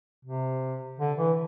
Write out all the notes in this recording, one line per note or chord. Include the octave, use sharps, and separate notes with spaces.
C3
D3
E3